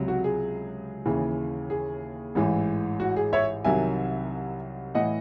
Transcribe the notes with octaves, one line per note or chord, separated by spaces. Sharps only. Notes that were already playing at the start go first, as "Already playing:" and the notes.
Already playing: C#2 C3 F#3
F#4
G#4
D#2 C#3 E3
G#4
A1 G#2 E3
F#4
G#4
C#5 E5
C2 C3 D#3 F#3 E5 G#5
A2 E3 D#5 F#5